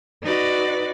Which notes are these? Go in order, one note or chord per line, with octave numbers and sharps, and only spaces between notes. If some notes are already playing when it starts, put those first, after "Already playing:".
D#4 F#4 B4 D5